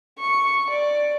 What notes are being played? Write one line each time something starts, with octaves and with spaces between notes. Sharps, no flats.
C#6
D5